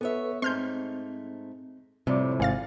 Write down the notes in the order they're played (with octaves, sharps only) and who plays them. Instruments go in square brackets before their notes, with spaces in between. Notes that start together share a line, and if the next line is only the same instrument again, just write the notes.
[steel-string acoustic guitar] B3 C#5 E5 [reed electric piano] A4 B4
[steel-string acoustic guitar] G#2 A3 [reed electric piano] C4 [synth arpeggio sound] C6 F6 G6
[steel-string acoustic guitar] F2 A2 [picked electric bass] C3 [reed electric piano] G3 D5 D6
[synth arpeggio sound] G#1 F5 A6 [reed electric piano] G#5